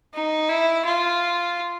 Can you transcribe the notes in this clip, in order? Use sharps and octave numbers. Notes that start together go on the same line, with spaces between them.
D#4
E4
F4